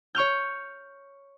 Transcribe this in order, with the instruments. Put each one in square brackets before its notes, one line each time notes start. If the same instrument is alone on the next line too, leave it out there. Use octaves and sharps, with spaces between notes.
[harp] C#5 C#6 F6 G6